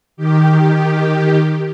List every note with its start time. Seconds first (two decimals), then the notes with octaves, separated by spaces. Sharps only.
0.17 D#3 G4